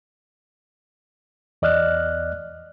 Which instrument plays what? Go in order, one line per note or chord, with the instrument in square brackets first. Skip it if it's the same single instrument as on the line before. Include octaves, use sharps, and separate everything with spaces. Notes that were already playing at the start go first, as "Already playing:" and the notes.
[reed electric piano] E2 D5 D#5 F6 F#6